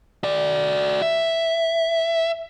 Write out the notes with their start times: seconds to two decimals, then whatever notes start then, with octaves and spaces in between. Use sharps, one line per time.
0.24 F#4 D5
1.02 E5